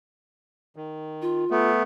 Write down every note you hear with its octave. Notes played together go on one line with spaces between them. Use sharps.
D#3
F4
A3 B3